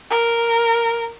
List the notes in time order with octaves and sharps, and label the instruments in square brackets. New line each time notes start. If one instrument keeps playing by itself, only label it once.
[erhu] A#4